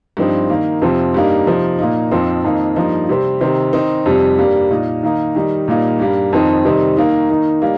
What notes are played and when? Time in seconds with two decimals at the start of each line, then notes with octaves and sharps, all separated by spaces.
0.17 G2 F3 C4 D#4
0.49 D#3 A#3 D#4
0.82 F2 C3 F3 C4
1.14 G2 G3 A#3 D#4
1.47 C3 F3 D#4
1.79 A#2 A#3 D#4
2.11 F2 F3 C4 D#4
2.44 F2 D#3 A#3 D#4
2.76 G2 F3 A#3 D#4
3.09 C3 G3 C4
3.41 C3 D#3 C4 D#4
3.73 D#3 C4 D#4
4.06 F2 C3 G3
4.38 G2 G3 A#3
4.70 A#2 A#3 D#4
5.03 D#3 A#3 D#4
5.35 D#3 G3 D#4
5.68 A#2 G3 A#3 D#4
6.00 G2 G3 A#3
6.33 F2 D#3 C4 D#4
6.65 C3 D#3 G3 C4 D#4
6.97 D#3 A#3 D#4
7.30 D#3 A#3 D#4
7.62 G3 A#3 D#4